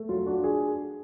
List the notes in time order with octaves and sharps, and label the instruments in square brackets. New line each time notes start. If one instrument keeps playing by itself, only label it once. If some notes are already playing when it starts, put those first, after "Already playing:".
Already playing: [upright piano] A3
F#3 F4
D4 F#4
G#4